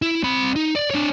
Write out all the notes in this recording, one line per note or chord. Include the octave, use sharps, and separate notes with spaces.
E4
C4 B5
D#4
D5
D4 C#5